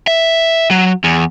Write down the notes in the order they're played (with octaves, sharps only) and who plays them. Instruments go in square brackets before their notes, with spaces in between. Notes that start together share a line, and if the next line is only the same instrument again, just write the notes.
[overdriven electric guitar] E5
F#3
E2